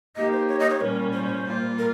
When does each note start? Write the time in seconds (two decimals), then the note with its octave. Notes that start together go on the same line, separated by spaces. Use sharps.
0.16 A#3 D#4 G4 D#5
0.32 C5
0.49 C#5
0.60 D#5
0.70 C#5
0.81 A#2 G3 C#4 A#4
1.14 C5
1.46 A#2 G3 A#3 F4
1.79 A#4